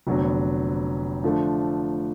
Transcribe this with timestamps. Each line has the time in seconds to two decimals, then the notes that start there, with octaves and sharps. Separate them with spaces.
0.07 F1 F2 D3 F#3 B3
1.23 D3 F3 A3 D4